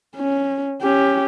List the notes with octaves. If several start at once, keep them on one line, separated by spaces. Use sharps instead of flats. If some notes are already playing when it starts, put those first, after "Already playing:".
C#4
C#4 G4